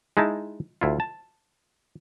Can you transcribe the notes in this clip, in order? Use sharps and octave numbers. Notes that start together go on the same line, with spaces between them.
G#3 D#4 E4 A5
D2 E4 F4
A5